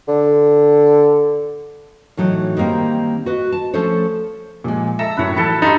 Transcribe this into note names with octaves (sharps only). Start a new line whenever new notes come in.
D3
A2 E3 F#3 D#4
D#3 G3 A#3 C4
F#4 B4 D#5
A5
F3 A3 C#4 A4 C5 C#5
A#2 F3 G#3
A4 E5 A#5 E6
F#2 A2 B4 C#5
E3 F#3 A4 A5 B5
G2 D#4 E5 C6